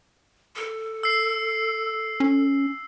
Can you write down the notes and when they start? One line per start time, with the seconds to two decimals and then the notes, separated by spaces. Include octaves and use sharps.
0.56 A4
1.03 E6 C7
2.20 C#4